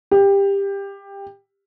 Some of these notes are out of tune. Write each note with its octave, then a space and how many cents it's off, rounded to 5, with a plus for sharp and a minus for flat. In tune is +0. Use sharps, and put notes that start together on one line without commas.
G4 +20